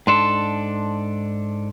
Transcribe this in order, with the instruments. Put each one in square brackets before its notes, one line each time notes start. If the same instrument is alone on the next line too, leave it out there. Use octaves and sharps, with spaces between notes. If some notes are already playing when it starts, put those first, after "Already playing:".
[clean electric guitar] G#2 D4 A4 [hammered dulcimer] C6